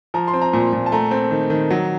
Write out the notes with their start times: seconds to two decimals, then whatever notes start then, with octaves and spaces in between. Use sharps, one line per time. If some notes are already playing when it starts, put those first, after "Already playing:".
0.14 F3 A#5
0.28 C6
0.34 C4
0.42 A#5
0.53 A#2
0.73 A#2
0.86 A5
0.92 A3 A#5
1.11 C4
1.31 D#3
1.50 D#3
1.71 F#3